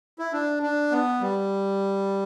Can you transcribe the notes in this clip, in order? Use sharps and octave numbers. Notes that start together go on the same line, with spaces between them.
E4
D4
D4
B3
G3